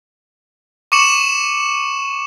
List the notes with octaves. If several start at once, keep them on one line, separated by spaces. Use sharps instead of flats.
C#6 D6 C#7 E7 F#7